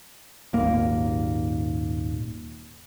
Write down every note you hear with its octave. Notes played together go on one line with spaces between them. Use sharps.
D#1 G#1 A#3